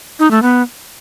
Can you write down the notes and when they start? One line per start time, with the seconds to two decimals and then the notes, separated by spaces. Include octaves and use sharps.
0.19 D#4
0.31 A3
0.42 B3